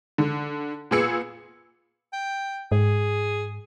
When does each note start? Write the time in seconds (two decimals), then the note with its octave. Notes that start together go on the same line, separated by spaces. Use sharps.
0.18 D3
0.91 A#2 B3 G#4 E6 C#7
2.13 G5
2.72 G#2 G#4